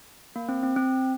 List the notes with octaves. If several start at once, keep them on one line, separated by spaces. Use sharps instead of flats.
A#3
C4
C4
C4